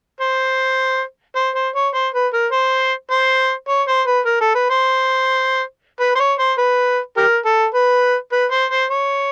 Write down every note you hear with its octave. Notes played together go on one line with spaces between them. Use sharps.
C5
C5
C5
C#5
C5
B4
A#4
C5
C5
C#5
C5
B4
A#4
A4
B4
C5
B4
C5
C#5
C5
B4
G4 A#4
A4
B4
B4
C5
C5
C#5